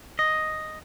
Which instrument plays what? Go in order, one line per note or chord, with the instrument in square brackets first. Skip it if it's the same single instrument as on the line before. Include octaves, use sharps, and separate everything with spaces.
[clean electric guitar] D#5